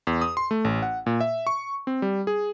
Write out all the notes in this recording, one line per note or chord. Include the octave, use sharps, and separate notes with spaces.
E2
D#6
C6
A3
A1
F#5
A#2
E5
C#6
C4
G3
G#4